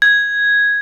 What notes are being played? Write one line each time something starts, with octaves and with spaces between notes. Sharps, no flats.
G#6